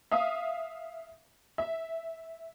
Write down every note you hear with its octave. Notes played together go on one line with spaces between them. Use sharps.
E5 F5 D#6
E5